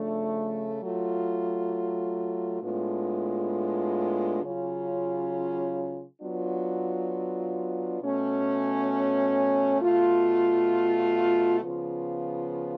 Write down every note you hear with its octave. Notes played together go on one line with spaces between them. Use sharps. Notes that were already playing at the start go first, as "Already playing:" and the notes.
Already playing: C#3 F3 A3 D4
F#3 A3 F4
A2 G#3 B3 D4 F4
C#3 F#3 C#4 F4
F#3 B3 D4 F4
B2 A3 C#4
B2 A3 F4
C#3 F3 B3 F4